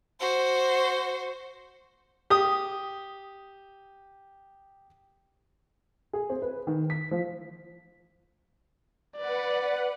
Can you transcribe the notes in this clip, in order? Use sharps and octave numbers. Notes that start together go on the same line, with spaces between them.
F#4 C5
G4 D#6
G#4
C4
B4
D#3
B6
F3
B4 D5 F#5